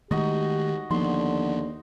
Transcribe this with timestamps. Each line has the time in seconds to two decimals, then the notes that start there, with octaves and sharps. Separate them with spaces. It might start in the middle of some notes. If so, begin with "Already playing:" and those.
0.11 D#3 G#3 A3 D#4 F#4 G4 D#5
0.91 D#2 D3 F3 B3 C6